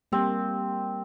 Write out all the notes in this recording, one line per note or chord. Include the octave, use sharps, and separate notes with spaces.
G3 A#3 C4 G4